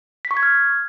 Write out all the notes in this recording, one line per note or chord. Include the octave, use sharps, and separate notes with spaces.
B6
C#6
G#6
F6